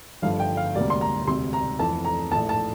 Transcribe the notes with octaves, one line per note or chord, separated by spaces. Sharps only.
G1 G2 D3 F3 A3 F5
G5
F5
E1 D2 C3 G3 A#3 D5
C6
A#5
E1 D2 C3 C6
A#5
F2 E3 A3 A5
A#5
A#1 A2 F3 A3 A5
A5